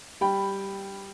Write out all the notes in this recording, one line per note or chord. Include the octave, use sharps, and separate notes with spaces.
G3 G5 B5